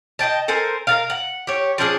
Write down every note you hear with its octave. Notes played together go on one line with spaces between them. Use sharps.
D#5 F5 G5 A5
A4 A#4 C5 G#5
A#4 D5 F5
F#5
G4 C#5
F3 C#4 D4 G#4